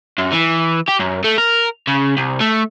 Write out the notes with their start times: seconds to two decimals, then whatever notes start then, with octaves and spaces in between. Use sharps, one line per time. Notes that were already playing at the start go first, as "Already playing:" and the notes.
0.18 F#2
0.33 E3
0.88 G4
0.99 F#2
1.24 A3
1.38 A#4
1.88 C#3
2.17 C2
2.41 A3